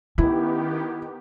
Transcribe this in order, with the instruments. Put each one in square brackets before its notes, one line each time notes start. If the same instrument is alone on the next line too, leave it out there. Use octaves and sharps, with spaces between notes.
[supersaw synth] D#3 B3 G4 [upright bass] C#4 [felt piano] E4